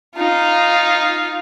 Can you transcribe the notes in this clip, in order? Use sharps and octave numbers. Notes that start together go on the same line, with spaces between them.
D#4 F4